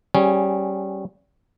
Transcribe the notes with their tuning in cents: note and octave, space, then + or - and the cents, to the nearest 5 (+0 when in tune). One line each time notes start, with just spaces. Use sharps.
G3 -25 C#4 -15 G#4 +0